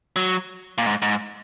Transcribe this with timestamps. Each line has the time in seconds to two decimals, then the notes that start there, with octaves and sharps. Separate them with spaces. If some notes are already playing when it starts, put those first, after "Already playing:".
0.16 F#3
0.78 A#2
0.86 G#2
1.02 G#2